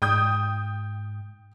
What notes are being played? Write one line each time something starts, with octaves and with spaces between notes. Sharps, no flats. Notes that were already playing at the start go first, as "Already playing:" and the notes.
G#2 G5 D#6 G6